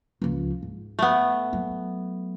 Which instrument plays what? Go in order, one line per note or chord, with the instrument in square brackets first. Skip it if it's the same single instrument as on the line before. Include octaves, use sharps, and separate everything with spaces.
[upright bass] C#2 F3
G#2
[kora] A3 B3
[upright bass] F#3